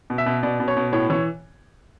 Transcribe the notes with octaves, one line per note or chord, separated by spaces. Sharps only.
B2
E5
B2
B2 D5
B2
C#5
B2
A2 C#5
E3 C#5